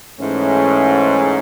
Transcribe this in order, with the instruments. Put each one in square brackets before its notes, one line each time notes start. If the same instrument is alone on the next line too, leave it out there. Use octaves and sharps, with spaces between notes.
[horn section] G#2 [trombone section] E3 A3 C#4